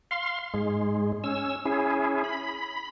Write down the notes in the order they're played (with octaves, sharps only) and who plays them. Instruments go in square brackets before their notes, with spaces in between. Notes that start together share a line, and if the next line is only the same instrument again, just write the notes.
[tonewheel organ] F5 C6
G#2 G#3
C#4 E6
C#4 E4 G#4
B5